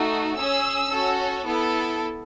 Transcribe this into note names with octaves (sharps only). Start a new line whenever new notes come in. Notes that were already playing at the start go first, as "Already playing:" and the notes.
Already playing: A3 D#4 F#4
C#4 G#4 E6
C#4 F#4 A4
B3 E4 A4